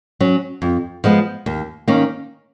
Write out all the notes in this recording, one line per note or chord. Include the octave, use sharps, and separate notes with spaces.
F#3 C#4
F2
F3 G#3 B3
D#2
D#3 A#3 C#4